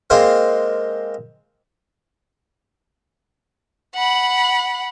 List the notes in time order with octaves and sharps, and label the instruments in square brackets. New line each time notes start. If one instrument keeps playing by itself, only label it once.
[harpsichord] G#3 A#3 C4 F5
[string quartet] F#5 B5